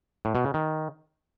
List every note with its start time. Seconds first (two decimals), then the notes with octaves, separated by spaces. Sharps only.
0.25 A2
0.35 B2
0.44 C#3
0.54 D#3